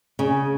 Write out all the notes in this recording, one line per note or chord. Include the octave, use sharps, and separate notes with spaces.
C#3